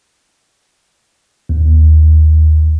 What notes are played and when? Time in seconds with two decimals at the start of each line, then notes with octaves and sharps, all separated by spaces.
1.49 D#2